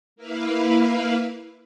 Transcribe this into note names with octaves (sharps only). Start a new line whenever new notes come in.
A#3 E4 B4 F5